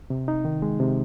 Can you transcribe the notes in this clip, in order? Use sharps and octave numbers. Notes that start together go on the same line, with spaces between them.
C3
D#4
D#3
G#3
C3